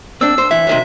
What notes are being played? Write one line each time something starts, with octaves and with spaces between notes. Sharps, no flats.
C4 D4 E6
C5
E3 E5
C3 D#3 F#3